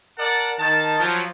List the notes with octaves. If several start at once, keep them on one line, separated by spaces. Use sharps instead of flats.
A#4 D5 F#5 A5
D#3 D#4 A5
F3 F#3